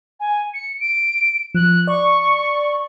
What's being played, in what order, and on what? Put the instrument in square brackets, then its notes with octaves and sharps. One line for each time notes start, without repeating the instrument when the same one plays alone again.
[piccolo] G#5
C#7
D7
[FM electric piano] F3 [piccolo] F#6
[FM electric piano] D5 [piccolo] C#6